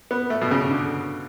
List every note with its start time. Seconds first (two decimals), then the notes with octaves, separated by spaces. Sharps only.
0.11 B3
0.30 A3
0.42 B2
0.51 C#3
0.71 D3